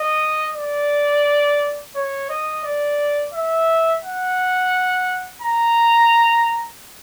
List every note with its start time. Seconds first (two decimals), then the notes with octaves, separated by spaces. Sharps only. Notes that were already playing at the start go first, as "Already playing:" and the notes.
Already playing: D#5
0.55 D5
1.95 C#5
2.29 D#5
2.64 D5
3.33 E5
4.04 F#5
5.42 A#5